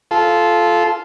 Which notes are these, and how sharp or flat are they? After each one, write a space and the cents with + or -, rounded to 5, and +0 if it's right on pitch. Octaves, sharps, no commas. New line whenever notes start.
F4 -5 A4 -20